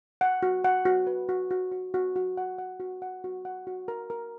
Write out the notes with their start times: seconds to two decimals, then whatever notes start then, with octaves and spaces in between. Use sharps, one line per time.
0.21 F#5
0.43 F#4
0.64 F#5
0.85 F#4
1.07 B4
1.29 F#4
1.51 F#4
1.72 F#4
1.94 F#4
2.16 F#4
2.37 F#5
2.58 F#5
2.80 F#4
3.02 F#5
3.24 F#4
3.45 F#5
3.67 F#4
3.88 A#4
4.10 A#4